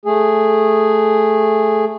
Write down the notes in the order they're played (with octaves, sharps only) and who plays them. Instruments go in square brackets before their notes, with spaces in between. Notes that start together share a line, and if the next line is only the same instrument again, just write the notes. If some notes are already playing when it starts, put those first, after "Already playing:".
[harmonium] A3 G#4